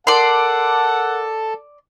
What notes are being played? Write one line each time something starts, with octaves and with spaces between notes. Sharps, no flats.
A4 A#4 D5 F#5 C6